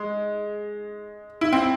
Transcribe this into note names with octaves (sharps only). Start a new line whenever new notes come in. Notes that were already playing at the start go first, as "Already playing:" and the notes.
Already playing: G#3
E4
C4